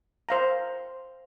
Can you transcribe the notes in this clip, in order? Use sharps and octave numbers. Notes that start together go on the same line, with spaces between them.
C5 F5 A#5